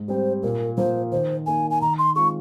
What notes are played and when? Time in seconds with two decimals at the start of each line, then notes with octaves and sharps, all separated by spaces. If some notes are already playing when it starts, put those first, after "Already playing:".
Already playing: G#2
0.08 G3 C4 C5
0.43 A#2 A#4
0.78 F3 A#3 C5
1.12 D#3 C5
1.46 A#3 D#4 G#5
1.71 G#5
1.81 D#3 A#5
1.98 C6
2.15 G#3 C4 F4 G#4 C#6